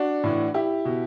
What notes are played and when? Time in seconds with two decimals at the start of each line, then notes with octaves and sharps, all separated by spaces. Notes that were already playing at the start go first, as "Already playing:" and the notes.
Already playing: D4 F#4
0.24 A2 E3
0.54 E4 G4
0.85 B2